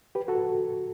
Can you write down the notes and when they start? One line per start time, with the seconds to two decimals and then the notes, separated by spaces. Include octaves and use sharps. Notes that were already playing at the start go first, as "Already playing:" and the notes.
0.15 G4 B4
0.28 F#4 A4